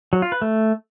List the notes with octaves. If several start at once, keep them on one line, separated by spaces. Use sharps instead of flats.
F#3
F4
B4
A3